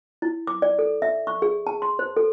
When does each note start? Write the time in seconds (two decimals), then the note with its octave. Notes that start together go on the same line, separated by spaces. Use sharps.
0.22 E4
0.47 D6
0.62 D5
0.79 A4
1.02 E5
1.27 C#6
1.42 G#4
1.67 A5
1.82 C6
1.99 C5
2.17 A4